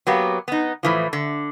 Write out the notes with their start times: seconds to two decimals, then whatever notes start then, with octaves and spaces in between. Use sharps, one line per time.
0.07 F#3 A#3 B3 G4
0.48 B3 D#4
0.83 A2 E3 F3
1.13 D3